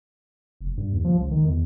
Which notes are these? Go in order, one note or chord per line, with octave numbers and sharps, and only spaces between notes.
F1
G2
D#2
F3
C#2
D#3
E2